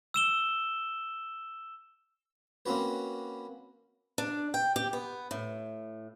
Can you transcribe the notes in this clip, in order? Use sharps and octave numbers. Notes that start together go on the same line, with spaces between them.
E6 E7 G7
A#3 C4 C#4 F#4 B4
D4
G5
G4
B3
A2